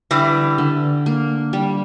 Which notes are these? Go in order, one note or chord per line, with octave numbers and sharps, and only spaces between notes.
D3 E3 G3
D3
A#3
G3